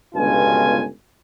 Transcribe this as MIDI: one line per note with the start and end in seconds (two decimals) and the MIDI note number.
0.14 0.84 31
0.14 0.84 37
0.14 0.84 43
0.14 0.84 47
0.14 0.84 65
0.14 0.84 80